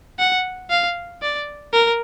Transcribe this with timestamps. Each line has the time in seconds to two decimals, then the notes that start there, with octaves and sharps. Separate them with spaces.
0.19 F#5
0.70 F5
1.23 D5
1.74 A#4